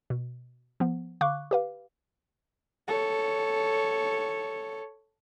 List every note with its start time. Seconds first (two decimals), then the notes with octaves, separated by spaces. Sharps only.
0.10 B2
0.80 F3 B3
1.21 D3 F5 C#6 D6 F#6
1.51 G4 B4 F5
2.88 A4 C#5